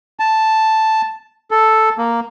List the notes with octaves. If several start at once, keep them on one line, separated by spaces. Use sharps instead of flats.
A5
A4
A#3